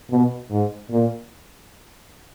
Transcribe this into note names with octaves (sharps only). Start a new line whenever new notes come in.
B2
G#2
A#2